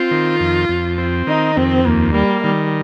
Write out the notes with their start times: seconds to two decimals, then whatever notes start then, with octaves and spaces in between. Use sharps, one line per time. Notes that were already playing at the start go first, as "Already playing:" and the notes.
Already playing: C4 F4
0.11 D#3
0.40 F2
0.69 F2
0.98 C4
1.27 D#3 D#4
1.56 F2 C4
1.86 D#2 A#3
2.14 G3 A#3
2.44 D#3 G3